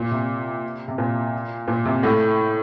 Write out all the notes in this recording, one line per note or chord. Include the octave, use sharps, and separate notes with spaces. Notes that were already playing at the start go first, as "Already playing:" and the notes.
Already playing: A#2
C3
C3
A#2
A#2
C3
A2